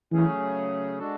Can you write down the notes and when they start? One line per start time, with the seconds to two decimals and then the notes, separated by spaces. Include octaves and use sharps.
0.12 C#3 E3 F#3 A3 C#4 G#4
0.99 G#3 D4 F#4 A4